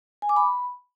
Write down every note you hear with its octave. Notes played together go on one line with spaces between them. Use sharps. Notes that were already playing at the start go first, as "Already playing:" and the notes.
G#5
D6
B5